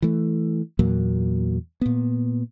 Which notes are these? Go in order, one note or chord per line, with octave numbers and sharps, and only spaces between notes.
E3 A3
E2 A#2 F#3 A#3
A#2 B3